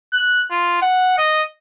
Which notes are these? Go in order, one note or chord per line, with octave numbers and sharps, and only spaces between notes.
F#6
F4
F#5
D#5